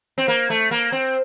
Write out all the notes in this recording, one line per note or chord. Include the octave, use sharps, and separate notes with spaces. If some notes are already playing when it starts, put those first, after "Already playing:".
C4
A#3
A3
A#3
C4